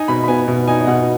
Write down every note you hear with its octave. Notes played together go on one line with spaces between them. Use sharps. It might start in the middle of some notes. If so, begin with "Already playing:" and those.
Already playing: D#4 G#5
B2 B5
B5
B3 G#5
B2
D#4 G#5
D#5
B2 F#5